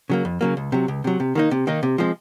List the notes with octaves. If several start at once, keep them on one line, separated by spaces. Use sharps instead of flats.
C#3 F#3 A#3
F2
C#3 F#3 A#3
C#2
C3 F#3
C#2
C3 F#3
C3
D#3 A#3 D#4
C3
D#3 A#3 D#4
C3
F3 G#3 C4